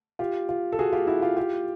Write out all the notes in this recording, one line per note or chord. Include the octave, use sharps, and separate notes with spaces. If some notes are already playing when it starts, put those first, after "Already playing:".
F4 G4
F4
A4
F#4 G#4
F4 G4
E4 F#4
F4 G4
F4 G4